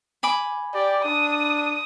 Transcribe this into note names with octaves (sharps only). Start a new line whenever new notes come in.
G#5 B5 D6
G4 D5
D4 D#6